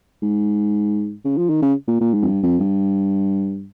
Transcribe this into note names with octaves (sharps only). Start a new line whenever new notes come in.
G#2
C#3
F3
D#3
C#3
A#2
A#2
G#2
F2
G2
F2
G2